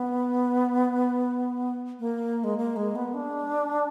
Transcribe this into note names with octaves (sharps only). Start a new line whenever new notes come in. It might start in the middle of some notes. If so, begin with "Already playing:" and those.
Already playing: B3
A#3
G#3
A#3
G#3
B3
D4